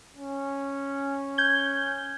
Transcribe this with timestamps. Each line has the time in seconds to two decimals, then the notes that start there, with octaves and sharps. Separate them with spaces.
0.17 C#4
1.38 G6 G#6 G7